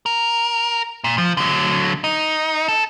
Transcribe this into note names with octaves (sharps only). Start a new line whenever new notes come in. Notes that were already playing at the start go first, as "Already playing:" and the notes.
A#4
A#2
F3
D3 F#3
D#4
A4